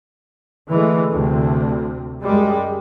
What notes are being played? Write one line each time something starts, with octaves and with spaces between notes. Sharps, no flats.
D3 E3 G#3 A3
D2 C3
F#2 G3 G#3